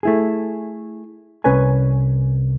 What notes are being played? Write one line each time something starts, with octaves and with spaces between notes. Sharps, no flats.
A3 E4 G#4
C2 C#4 B4 C#5 G#5